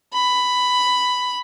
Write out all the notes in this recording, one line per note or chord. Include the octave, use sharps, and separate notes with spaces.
B5